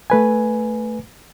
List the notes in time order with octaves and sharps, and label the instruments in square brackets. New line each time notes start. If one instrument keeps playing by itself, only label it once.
[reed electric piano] A3 B4 G#5